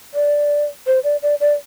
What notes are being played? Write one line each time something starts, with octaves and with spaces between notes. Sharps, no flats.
D5
C5
D5
D5
D5